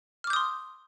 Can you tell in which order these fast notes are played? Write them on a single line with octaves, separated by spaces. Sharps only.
F6 D6 G6 D#6 C6